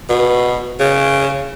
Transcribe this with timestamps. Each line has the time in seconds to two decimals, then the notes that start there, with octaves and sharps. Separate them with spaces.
0.09 B2
0.80 C#3